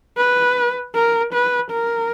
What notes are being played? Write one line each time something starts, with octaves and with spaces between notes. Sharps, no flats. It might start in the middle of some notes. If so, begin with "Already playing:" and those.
B4
A#4
B4
A#4